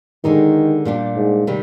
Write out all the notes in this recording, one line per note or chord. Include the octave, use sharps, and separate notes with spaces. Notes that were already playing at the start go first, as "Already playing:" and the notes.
D3 D#3 G#3 D#4 G4
A#2 G3 D4 G4
G#2
C3 D#3 G3